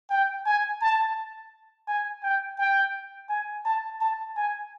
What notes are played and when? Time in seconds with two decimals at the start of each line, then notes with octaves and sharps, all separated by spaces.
0.10 G5
0.46 G#5
0.81 A5
1.88 G#5
2.23 G5
2.58 G5
3.29 G#5
3.65 A5
4.01 A5
4.36 G#5